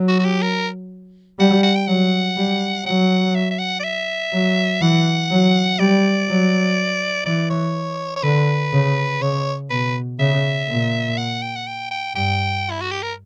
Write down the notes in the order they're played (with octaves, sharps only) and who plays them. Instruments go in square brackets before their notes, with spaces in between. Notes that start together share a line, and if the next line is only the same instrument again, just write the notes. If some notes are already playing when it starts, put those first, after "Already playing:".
Already playing: [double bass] F#3
[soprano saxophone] F#4
F#4
G4
A#4
[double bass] G3 [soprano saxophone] F#5
[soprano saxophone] F#5
G5
[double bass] F#3 [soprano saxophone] F#5
[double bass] G3
[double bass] F#3 [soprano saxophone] F#5
[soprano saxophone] E5
E5
F#5
D5
E5
[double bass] F#3
[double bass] E3 [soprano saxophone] F#5
[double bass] F#3
[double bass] G3 [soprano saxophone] D5
[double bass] F#3
[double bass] E3 [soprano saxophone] D5
[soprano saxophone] C#5
C#5
[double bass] D3 [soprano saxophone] B4
[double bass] C#3
[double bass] C#3 [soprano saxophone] C#5
[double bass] B2 [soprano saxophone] B4
[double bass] C#3 [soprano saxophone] E5
[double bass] A#2
[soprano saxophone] F#5
G5
F#5
G5
G5
[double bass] G2 [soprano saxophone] G5
[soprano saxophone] E4
F#4
G4
A#4